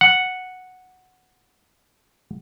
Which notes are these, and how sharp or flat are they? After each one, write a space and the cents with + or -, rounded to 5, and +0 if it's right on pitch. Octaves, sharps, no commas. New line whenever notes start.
F#5 -5